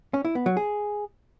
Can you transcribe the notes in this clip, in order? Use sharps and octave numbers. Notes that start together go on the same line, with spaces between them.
C#4
E4
B3
F#3
G#4